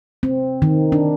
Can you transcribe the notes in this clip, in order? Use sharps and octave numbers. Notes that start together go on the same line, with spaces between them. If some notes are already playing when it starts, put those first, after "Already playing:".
C4
D#3
D4